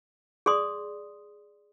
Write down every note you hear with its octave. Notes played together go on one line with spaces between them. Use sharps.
G#4 D5 C6 D#6